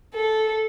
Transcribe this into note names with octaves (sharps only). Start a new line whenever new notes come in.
A4